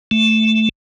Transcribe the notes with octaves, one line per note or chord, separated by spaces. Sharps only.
A3